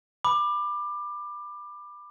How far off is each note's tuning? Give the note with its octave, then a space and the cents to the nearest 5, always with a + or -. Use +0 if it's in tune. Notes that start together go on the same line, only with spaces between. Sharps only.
B5 +0 D6 +20